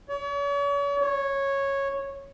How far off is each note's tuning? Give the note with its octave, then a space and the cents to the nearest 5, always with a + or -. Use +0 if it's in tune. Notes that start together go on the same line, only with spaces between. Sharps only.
C#5 +40
C#5 -10